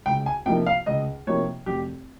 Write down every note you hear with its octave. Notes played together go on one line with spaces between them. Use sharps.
C#2 G5
G#5
C3 F3 A#3 D#4 G5
F5
C#2 D#5
C3 F3 A#3 D#4 C#5
F1 G4